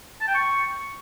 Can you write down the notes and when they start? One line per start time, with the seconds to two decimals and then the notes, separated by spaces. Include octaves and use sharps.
0.21 A5
0.28 G5
0.35 C#6